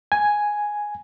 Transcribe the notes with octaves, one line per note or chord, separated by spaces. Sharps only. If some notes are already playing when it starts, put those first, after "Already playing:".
G#5